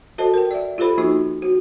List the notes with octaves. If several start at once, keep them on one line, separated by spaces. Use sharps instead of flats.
F#4 A4 C5 D#5 A5
A#4 G5
D5 E5
F4 G4 A4 C5 B5
F3 A#3 D#4 F#4 C#6
F#4